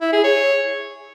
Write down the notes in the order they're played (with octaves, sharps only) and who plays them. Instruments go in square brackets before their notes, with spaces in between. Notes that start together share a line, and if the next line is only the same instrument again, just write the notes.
[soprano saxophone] E4
G#4
C#5